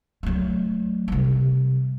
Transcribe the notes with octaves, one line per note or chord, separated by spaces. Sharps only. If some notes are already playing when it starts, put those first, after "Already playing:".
F#3 A3
C3 G3